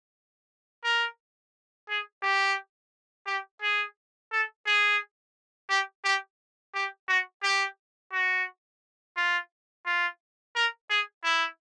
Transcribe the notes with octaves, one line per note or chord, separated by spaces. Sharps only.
A#4
G#4
G4
G4
G#4
A4
G#4
G4
G4
G4
F#4
G4
F#4
F4
F4
A#4
G#4
E4